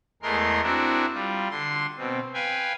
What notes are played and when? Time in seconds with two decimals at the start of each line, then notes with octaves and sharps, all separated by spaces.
0.22 E2 G#3 A3 A#4 C6
0.63 C4 D4 E4 F#4 A#4
1.14 G3 F4
1.50 D3 C6
1.98 B2 C4
2.34 B4 F5 G5 G#5